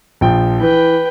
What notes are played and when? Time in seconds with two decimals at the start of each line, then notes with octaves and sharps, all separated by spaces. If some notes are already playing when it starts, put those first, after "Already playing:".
0.21 A#1 F3 G5
0.60 E3 B4 G5